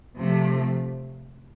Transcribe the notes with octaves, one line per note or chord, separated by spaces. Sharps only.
C3 F3 A3